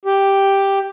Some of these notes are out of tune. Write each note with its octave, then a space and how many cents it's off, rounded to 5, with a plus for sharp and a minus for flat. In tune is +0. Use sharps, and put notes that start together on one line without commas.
G4 +0